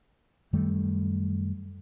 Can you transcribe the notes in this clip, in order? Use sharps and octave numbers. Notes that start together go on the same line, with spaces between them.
F#2 D#3 G3 A3